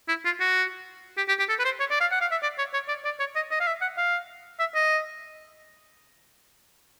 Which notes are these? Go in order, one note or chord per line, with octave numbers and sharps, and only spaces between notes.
E4
F4
F#4
G4
G4
G4
A4
B4
C5
C#5
D5
F5
F#5
F5
E5
D5
C#5
C#5
D5
D5
C#5
D#5
D#5
F5
E5
F#5
F5
E5
D#5